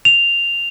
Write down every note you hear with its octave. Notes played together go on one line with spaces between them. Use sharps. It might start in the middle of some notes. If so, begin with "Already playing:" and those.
F7